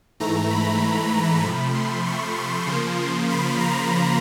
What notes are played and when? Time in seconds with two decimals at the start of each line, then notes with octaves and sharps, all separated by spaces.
0.20 G#2 E3 A3 A#5
0.51 B5
1.12 B5
1.43 C3 F3 A3 B5
1.74 C6
2.06 C#6
2.37 C6
2.67 C#3 F3 A#3
3.30 B5
3.60 A#5